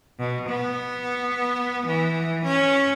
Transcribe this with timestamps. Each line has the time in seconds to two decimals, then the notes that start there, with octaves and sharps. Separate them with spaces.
0.19 B2
0.48 B3
1.86 E3
2.45 C#4